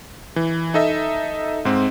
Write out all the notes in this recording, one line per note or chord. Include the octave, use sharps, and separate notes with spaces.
E3
D#4 A4 D#5 E5
G#2 C4